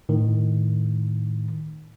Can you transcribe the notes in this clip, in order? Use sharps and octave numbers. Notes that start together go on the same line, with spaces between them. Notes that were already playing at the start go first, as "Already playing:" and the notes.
A2 D#3